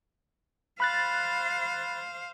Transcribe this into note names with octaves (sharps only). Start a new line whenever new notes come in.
C5 F5 B5 F#6 A6